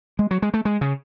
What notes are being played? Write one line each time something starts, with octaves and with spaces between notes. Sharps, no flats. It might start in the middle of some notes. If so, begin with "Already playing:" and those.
G#3
F#3
G#3
A3
G#3
C#3